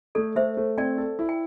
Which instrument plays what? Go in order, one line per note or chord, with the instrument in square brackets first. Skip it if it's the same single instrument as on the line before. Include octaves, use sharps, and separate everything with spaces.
[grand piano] A3 [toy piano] A4 D5
[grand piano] A3 [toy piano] C5 E5
[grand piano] A3
[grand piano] C4 [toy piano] D5 G5
[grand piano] A4
E4
[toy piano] G5